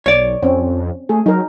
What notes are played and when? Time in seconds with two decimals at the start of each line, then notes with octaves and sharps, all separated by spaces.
0.06 B1 C#5 D5
0.43 F2 C4 C#4
1.09 A3 G#4
1.26 F#3 D#4 A#4